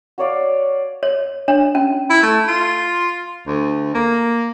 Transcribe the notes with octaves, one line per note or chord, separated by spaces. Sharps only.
F#4 C#5 D5 F5
C#5
D4 C#5
C#4
E4
A3
F4
D2
A#3